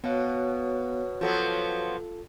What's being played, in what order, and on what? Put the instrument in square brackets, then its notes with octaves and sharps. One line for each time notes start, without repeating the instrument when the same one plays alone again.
[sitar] B2 [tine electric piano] B3 F5 [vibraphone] F#4 C#5
[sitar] F3 F#3 B3 [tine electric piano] F4 A4